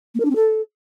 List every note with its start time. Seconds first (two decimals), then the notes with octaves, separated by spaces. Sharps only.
0.14 A#3
0.20 A#4
0.25 D4
0.30 C4
0.35 A4